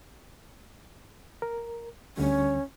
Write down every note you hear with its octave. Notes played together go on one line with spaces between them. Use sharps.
A#4
D2 D3 G3 C#4